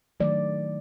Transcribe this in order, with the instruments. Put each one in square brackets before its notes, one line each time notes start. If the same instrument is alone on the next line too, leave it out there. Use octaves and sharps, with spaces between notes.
[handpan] D#3 F#3 A3 D5